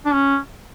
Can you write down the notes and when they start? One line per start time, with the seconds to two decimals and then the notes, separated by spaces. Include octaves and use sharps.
0.05 D4
0.14 C#4